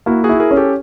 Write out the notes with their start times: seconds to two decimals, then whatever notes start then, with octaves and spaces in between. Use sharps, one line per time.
0.06 A#3 E4 F#4
0.24 F#4 G#4
0.29 E4
0.40 G#4 A#4
0.51 C#4
0.57 G4 A4